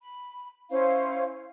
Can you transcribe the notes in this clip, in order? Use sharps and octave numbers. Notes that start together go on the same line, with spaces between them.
B5
C#4 E4 C5 F5